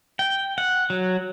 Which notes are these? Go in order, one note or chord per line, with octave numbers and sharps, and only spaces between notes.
G5
F#5
F#3